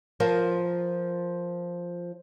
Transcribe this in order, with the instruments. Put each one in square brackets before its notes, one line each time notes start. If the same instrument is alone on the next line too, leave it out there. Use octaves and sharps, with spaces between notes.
[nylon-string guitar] F3 F4 A#4 C5